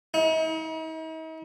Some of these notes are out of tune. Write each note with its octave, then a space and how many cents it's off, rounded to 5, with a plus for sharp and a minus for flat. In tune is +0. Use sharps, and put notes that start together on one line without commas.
D#4 +45